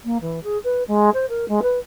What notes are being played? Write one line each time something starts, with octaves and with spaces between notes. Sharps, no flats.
A#3
E3
G#4
B4
G#3
C5
A#4
G#3
B4